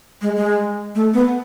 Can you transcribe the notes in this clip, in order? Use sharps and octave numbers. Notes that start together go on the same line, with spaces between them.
G#3
G#3
A3
B3